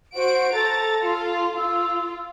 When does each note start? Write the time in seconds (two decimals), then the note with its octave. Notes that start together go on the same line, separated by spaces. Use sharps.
0.16 F#4 C5 D7
0.53 A4 A#5 A6
1.03 F4
1.57 F4 E6